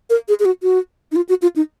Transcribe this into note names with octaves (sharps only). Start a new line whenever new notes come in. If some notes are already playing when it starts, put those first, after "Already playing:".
A#4
G#4
G#4
F#4
F#4
D#4
F4
F#4
F4
D#4